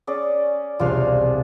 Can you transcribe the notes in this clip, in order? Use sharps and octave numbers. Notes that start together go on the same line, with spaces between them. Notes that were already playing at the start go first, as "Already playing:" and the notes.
C#4 G#4 D5
E1 C2 D4 F4 F5